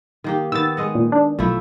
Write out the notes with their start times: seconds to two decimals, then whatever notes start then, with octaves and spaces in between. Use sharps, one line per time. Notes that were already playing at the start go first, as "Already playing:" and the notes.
0.24 D#3 A#3 G4
0.52 D#3 B3 E6 A6
0.77 G#3 D#5 F#5
0.95 A#2
1.12 D4
1.39 B1 F3 A3 E4